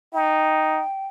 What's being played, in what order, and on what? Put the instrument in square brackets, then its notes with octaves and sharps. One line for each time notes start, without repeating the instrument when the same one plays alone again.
[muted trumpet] D#4 [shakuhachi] G5